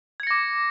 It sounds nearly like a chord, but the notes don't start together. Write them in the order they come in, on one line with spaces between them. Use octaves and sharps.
G#6 C#7 A#6 D6